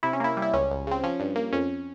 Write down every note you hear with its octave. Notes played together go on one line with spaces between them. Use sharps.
C3 E4
C#4
A#3 E4
G3
E4
C#2 C#4
C#2
C#3 C4
F3 C#4
G2
A#3
F2 C#4